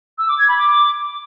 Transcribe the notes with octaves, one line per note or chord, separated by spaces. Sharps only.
E6
D6
G#6
B5
D6